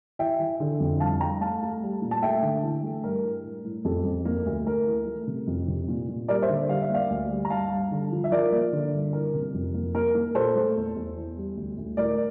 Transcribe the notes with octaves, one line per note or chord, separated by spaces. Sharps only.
E3 E5 G5
E3
D3
F2
G2 F5 A5
G2 G5 A#5
A3 F5 A5
A3
G3
A#2
A5
A3 E5 G5
D3
E3
A3
G2 A#4
G2
A2
A2
F2 A4
F2
A#3
D2
A3 A#4
E3
A3
C3
F2
C3
A#2
A#2
G3 A#4 D5
C5 E5
D3
G3 F5
E5
A#3 D5 F5
D2
G3
A#5
G2 F5 A5
G2
D3
F3
E5
F3 A#4 D5
A#3
D3
G2
E3 A#4
C3
F2
A#3
A#3 A#4
A#3
A#2 A4 C5
A3
E2
E2
E3
G3
D2
D2
A2 A#4 D5